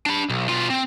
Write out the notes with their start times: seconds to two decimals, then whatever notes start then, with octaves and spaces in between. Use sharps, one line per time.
0.06 D4 B5
0.30 B1
0.49 B2 F4
0.70 C4